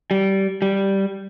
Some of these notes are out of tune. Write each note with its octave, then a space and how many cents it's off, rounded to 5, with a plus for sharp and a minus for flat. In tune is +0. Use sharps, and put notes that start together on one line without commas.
G3 -20
G3 -5